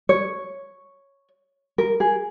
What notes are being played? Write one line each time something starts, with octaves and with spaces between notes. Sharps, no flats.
C#5
A#4
G#4